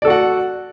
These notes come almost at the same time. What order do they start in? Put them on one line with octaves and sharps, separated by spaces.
D5 A4 F#4 F#5